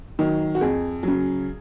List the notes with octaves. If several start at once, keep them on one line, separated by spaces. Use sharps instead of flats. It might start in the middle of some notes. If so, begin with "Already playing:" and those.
D#3 F#3
F#4
F2 G#4
C#3 F#3